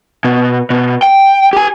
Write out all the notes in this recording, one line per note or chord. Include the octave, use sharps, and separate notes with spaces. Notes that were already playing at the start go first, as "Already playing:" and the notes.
B2
B2
G5
G4 G#5